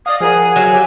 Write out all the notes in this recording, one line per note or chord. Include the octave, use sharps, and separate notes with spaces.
D5 D#5 F5 D#6
F3 G#4 A#4 F#5
F#3 F5 G#5
G4 E5 G5